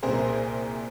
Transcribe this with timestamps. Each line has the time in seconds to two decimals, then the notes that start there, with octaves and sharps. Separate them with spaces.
0.03 C2 A#2 C4 G#4 A#4 C5